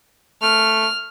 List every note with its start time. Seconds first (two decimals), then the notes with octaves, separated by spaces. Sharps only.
0.42 A3 F6